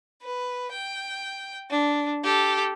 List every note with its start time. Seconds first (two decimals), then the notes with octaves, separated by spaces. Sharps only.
0.22 B4
0.72 G5
1.70 D4
2.24 G4 A4